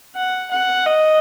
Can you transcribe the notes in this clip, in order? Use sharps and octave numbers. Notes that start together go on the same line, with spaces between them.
F#5
F#5
D#5